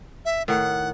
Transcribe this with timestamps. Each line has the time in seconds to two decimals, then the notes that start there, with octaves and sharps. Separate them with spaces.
0.25 E5
0.48 A2 D#3 F#5